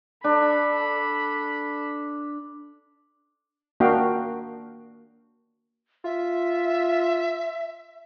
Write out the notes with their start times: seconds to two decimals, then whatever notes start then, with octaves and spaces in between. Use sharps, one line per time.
0.24 D4 A4 B5
3.80 A#3 D4 F#4 F5 G5
6.04 F4 E5